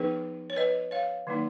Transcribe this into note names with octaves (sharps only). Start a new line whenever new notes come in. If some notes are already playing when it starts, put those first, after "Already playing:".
Already playing: F3 B3 D#4 G#4 B4
C#5
B4 D#5
C#5 F5
D#3 F#3 A#3 D#4